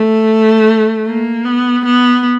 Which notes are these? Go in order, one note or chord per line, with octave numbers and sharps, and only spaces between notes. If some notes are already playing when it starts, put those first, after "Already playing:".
Already playing: A3
A#3
B3
B3